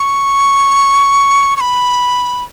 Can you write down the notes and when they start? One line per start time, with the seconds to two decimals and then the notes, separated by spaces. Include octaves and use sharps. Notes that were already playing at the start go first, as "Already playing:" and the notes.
Already playing: C#6
1.57 C#6
1.61 B5